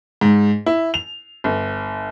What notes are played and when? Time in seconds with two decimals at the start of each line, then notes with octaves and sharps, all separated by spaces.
0.21 G#2
0.66 E4
0.94 F7
1.44 G1